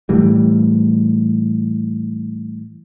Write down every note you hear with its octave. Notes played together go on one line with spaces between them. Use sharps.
A2 E3 G3